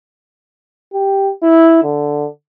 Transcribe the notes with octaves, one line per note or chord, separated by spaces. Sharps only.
G4
E4
D3